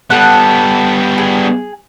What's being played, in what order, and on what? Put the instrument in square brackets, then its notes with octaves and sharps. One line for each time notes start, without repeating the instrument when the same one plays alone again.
[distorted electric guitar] G3 B3 [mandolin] A4 F#5
[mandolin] G#4